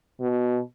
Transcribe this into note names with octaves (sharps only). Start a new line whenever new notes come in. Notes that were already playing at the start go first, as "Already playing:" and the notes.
B2